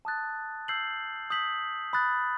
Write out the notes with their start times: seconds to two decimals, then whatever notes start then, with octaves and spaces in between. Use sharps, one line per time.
0.05 A5 D#6 F#6 A6
0.68 E6 G6 C7 F#7
1.30 D#6 G6 B6 F#7
1.93 B5 D#6 F#6 A6